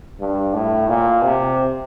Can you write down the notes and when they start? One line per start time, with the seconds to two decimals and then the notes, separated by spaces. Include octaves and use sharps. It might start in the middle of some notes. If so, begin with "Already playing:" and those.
0.20 G2
0.53 A2
0.89 A#2
1.23 C3